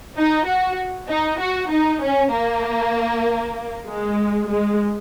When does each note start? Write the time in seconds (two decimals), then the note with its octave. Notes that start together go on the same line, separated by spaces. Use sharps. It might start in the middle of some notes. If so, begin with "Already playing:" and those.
0.17 D#4
0.47 F#4
1.09 D#4
1.40 F#4
1.71 D#4
2.01 C#4
2.33 A#3
3.87 G#3
4.49 G#3